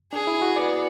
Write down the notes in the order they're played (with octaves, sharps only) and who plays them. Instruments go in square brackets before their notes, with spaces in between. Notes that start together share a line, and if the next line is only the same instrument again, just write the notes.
[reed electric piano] D4 [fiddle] G#4
[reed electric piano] E4
F#4
[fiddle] B3 [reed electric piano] D5